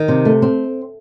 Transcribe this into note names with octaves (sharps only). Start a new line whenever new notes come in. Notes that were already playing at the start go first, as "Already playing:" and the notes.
Already playing: D#3
C3
A3
C4